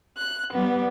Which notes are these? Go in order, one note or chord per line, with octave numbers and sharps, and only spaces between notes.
F#6
G3 B3